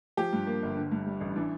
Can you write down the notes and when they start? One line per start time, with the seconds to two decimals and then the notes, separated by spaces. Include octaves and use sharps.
0.17 F3 G4
0.33 G2
0.47 A#3
0.63 G1
0.76 D3
0.91 G2
1.06 G3
1.21 A1
1.36 E3 D4